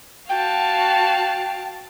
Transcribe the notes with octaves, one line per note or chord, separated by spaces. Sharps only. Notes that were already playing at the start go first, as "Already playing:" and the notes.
F#4 F5 G5 A5